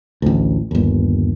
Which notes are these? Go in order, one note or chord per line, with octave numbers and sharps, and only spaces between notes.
A1 D2
G1 D#2